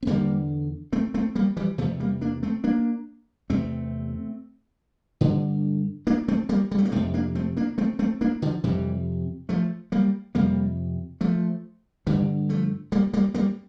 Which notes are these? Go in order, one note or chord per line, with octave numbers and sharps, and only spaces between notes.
C4
E2 D3 G3 A#3
A3 C4
A3 C4
G3 A#3
E3 G3
E2 C3 F3 A3
G3 A#3
A#3 D4
A3 C4
A#3 D4
E2 C3 A3 C4
G2 D3
A#3 D4
A3 C4
G3 A#3
G3
A3
A#3
F2 C3 A3 C4
A#3 D4
A3 C4
A#3 D4
A3 C4
A3 C4
A#3 D4
D3 F3
F2 C3 E3 G3
F3 A3
G3 A#3
F2 C3 G3 A#3
F3 A3
G2 D3 E3 G3
F3 A3
G3 A#3
G3 A#3
G3 A#3